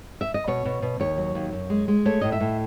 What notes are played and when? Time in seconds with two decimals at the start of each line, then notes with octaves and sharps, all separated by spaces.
0.21 E5
0.34 D#5
0.48 B2 C#5
0.65 B2
0.82 B2
1.00 D#2 C#5
1.18 F#3
1.35 D#2
1.52 F#2
1.70 G#3
1.88 G#3
2.05 A3 C#5
2.21 A2 D#5
2.32 E5
2.40 A2